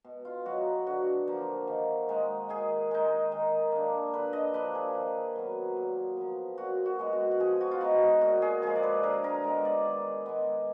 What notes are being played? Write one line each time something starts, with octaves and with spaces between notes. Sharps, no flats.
B2
F4
F#3 B3 D#4 F#4
D3 F#4
F3 A#3
D#3
G#3 D#4
D#3 G#4
G#3 D#4
D#3
A#3 D4
D3 B4
D#5
F3 A#3 D4 B4
G#4
D#3
F#3 B3
A#2
F3 B3
A#2 F#4
F#4
G#3 B3
F#4
F#4
F3 G#4
F#4
F4
G#3 B3 D#4 F#4
A#2 F#4
G#4
F3 G#3 G#4
D5
B4
D3 A#4
A#4
G#3 B3
D5
D#3
G#3 B3